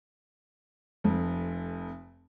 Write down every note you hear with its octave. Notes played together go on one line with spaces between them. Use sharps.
F1 F2